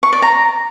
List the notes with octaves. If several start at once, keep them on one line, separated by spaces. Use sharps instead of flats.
C#6
D5
A#5